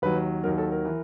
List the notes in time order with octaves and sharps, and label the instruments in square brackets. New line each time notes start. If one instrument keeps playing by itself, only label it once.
[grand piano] D#2 D#3 F#3 B4
D#2 D#3 F#3 A#4
A4
A#4
E3